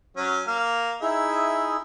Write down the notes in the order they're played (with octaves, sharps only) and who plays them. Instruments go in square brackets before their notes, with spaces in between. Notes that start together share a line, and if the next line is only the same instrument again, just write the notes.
[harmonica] F#3 C#4
A#3 F6
[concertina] D#4 E4 G#4 [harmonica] E5